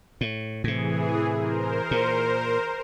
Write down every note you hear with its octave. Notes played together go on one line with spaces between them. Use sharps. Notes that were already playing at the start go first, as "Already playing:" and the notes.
A2
A2 C3 E3 G#4
A#4 C5
A#2